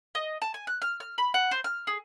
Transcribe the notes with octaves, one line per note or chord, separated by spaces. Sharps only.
D#5
A5
G#5
F#6
F6
F6
B5
F#5
C5
F6
G#4